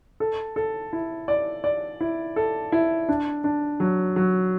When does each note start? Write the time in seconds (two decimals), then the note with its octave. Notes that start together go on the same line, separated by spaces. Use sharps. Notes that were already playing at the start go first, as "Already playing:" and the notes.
0.20 A4
0.56 A4
0.93 E4
1.28 D5
1.64 D5
2.01 E4
2.36 A4
2.72 E4
3.09 D4
3.44 D4
3.80 F#3
4.16 F#3